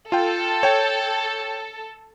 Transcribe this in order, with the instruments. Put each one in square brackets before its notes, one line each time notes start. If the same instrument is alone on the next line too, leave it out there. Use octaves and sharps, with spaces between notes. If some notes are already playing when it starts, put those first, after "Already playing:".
[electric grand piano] F4 G5 [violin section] A4
[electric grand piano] C#5 G5